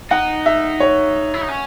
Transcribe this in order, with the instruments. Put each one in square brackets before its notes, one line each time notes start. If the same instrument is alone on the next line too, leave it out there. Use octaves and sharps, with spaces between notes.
[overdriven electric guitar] D#4 [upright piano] F#5
[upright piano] E5
C#5
[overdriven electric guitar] E4
D#4
C#4